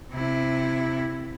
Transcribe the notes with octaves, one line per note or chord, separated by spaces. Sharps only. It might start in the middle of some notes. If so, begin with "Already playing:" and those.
C3 E4